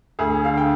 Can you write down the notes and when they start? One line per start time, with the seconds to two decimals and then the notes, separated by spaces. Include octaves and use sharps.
0.19 D2 G#4
0.44 D3 F5
0.58 G5